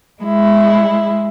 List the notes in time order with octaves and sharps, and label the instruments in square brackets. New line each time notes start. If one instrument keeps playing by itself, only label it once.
[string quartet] G#3 E4